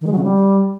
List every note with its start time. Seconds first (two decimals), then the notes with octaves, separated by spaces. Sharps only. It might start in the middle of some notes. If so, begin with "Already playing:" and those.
0.01 D#3
0.07 G#3
0.12 F#3
0.18 C#3
0.23 G3